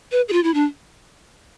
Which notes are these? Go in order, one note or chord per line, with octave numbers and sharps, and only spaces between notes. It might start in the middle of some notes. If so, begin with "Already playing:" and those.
B4
G#4
F4
E4
D4